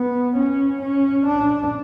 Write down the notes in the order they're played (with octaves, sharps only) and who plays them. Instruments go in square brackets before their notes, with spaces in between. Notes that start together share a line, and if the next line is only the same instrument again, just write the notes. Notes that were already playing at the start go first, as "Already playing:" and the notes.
Already playing: [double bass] B3
C#4
C#4
D4